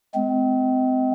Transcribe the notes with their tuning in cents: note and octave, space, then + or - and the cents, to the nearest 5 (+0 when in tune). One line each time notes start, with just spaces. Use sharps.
G#3 +25 C4 -30